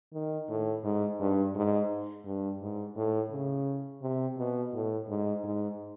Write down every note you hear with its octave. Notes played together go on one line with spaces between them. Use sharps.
D#3
A2
G#2
G2
G#2
G2
G#2
A2
C#3
C3
B2
A2
G#2
G#2